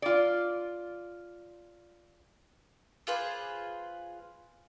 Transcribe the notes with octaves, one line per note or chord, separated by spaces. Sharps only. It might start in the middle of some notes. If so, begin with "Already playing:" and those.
F4 D5
F4 G#4 B4 C5